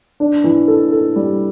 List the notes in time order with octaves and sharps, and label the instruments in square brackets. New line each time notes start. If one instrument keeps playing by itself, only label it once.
[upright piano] D4
E3
A4
A4
G3